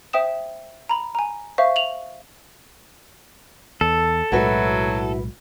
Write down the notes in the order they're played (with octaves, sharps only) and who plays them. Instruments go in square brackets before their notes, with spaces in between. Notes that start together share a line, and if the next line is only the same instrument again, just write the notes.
[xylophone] C5 E5 G5 D#6 E7
A#5 B5
G#5 A#5
C5 E5 F5 C#6
F7 F#7
[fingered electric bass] E2 [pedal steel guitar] A4
[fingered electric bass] B1 A2 G#3 [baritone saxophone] F#3 [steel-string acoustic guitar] E4 F#4 B4